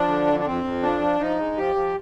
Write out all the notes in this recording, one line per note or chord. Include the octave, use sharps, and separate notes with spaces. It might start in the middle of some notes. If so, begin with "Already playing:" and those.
Already playing: F3 D4
D3
F2
D4
F2 C4
F2
F3 D4
F3
F3 D#4
G#3
F3 G4
F3